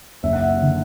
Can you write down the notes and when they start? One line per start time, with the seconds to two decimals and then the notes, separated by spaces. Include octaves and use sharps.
0.23 F#1 E5
0.33 F#5
0.41 E5
0.62 D3